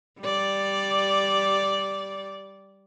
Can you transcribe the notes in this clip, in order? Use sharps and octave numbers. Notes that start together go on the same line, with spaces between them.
G3 D5